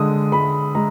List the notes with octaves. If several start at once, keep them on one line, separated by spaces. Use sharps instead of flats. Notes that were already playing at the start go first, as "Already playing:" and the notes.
Already playing: D3 G#3 D#6
G#3 B5
G#3 A#5